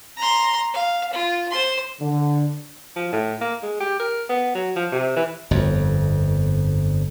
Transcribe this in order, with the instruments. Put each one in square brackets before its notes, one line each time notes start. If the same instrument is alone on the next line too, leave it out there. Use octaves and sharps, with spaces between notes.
[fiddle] A#5 C6
F5
F4
C5 C6
[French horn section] D3
[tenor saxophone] F3
A2
A#3
G#3
G4
A#4
B3
F#3
F3
C3
E3
[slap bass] G1 F2